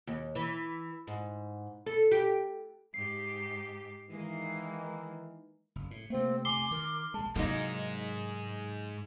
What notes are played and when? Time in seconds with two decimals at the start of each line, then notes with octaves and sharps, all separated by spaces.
0.07 D#2
0.35 E3
1.07 G#2
1.86 A4
2.11 G4
2.94 G#2 G4 C7
4.10 D#3 E3 G#3 A#3
5.76 F#1
5.91 A2
6.10 C3 A3 A#3 C4
6.45 G#5 C6 D6
6.71 D#3 A#4
7.14 A#1 G#3 A5
7.36 G#2 C3 F#3 G#3 A#3 D#4